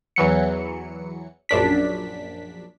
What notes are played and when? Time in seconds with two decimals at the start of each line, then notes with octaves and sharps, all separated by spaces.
0.16 E2 E3 F#3 C#7
1.49 A#1 F#2 D4 B6